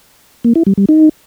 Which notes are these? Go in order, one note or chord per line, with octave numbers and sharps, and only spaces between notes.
A#3
E4
G3
G3
D#4